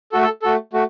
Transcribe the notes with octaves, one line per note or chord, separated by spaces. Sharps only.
A3 F#4 A4
A4
A3 F#4 A4
A3 F#4